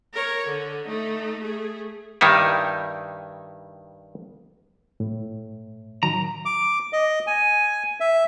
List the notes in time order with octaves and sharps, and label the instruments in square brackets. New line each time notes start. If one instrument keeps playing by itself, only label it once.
[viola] A#4 C#5
D3
A3 D#4
A3 G#4
[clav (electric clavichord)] G2 D#3 G3 D#4 E4
[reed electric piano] A2
[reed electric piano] D#3 F#3 [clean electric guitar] A#5
[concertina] D6
D#5
G#5
E5